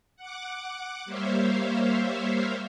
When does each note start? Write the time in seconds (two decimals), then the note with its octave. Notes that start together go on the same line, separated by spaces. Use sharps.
0.17 F#5 D6
1.05 G3 A#3 C5 C#5 E5 F5